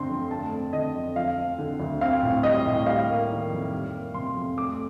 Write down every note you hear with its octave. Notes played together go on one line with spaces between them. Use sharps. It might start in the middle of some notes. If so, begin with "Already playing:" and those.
Already playing: G2 D3 A3 C4 C6
F2
A3 A5
C4
D3 D#5
F2
F3 F5
C4
D3
D2
C4 F5
A2
G3 D#5
A2
G3 F5
A#3
D#3
F2
G3
A#3
C3 C6
F2
A3 D6